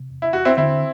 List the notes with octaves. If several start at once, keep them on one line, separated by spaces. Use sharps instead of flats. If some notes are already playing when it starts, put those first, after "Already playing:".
Already playing: C3
E2
E4
E2 F#4
C4 E4
D3 C4 E4